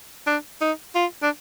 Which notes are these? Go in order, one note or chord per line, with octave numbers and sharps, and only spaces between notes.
D4
D#4
F4
D4